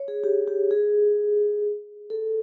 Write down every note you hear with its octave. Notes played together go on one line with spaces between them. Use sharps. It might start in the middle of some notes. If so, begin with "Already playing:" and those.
Already playing: C#5
G#4
G4
G4
G#4
A4